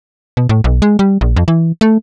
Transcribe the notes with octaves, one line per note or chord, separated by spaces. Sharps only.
B2
A2
B1
G#3
G3
A#1
F2
E3
A3